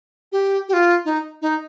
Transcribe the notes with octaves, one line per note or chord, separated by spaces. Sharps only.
G4
G4
F4
D#4
D#4